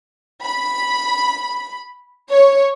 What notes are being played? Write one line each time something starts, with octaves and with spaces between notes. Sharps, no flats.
B5
C#5